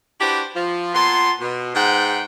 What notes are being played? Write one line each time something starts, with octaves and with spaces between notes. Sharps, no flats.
D4 E4 F#4 G4 B4 C5
F3
A#2 B3 A5 C6
B2
G#2 F#5 G5